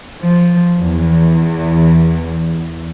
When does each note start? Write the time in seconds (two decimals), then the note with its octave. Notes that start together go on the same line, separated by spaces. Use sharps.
0.20 F3
0.78 E2